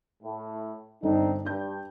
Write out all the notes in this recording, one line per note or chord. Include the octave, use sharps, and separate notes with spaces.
A2
G1 C4 D4 D#4 A4
G2 D4 G5 G6